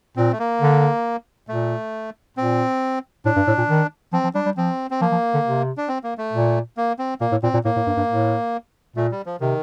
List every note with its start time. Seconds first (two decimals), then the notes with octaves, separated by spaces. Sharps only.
0.17 A#2 C4
0.32 A3
0.39 A#3
0.62 D3
1.48 A#2 A3
2.37 A#2 C4
3.25 A2 D4
3.36 G2
3.47 A2
3.58 A#2
3.69 D#3
4.13 F3 C4
4.24 F3
4.35 G3 D4
4.46 G3
4.57 F3 C4
4.91 C4
5.01 F3 A#3
5.12 F3
5.34 D3
5.45 C3
5.77 D4
5.88 C4
6.04 A#3
6.18 A3
6.33 A#2
6.77 A#3
6.99 C4
7.21 A#2 A#3
7.32 A2
7.43 A#2 C4
7.54 A#2
7.65 A2 A#3
7.76 A2
7.87 G2
7.97 G2
8.09 A2
8.96 A#2 A3
9.12 G3
9.26 F3
9.40 C3 D#3